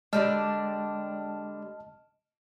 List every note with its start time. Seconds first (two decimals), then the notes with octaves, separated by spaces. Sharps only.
0.13 D3 G3 G#3 D4 D#5 A5 F6